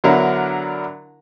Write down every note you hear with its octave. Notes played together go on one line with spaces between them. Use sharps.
D3 F#3 B3 D4 E4 A#4